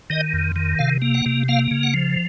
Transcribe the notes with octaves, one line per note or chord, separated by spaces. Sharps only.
D#3 D#5
F2
D#3
C3 F5
A#3
F#5
C3
A#3 F5
C#3
F#5
F3